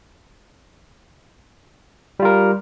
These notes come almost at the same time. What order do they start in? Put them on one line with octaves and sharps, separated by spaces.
G3 F4 A#4